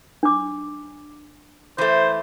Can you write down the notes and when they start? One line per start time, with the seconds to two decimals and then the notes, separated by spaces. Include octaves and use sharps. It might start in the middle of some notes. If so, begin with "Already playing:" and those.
0.23 D4 D6
1.78 E3 A3 C5